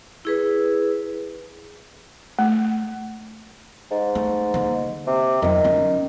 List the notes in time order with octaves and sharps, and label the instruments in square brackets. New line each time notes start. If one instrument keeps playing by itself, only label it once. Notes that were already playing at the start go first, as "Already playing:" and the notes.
[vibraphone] E4 G#4 B4
[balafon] A3
[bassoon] G#2
[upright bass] A3
D3 A#3
[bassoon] C3
[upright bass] F2 F#3 [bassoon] D#3
[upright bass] D3 C#4